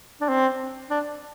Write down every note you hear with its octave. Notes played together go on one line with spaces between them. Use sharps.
D4
C4
D4